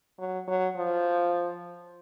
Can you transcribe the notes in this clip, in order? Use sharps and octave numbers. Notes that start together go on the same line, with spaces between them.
F#3
F#3
F3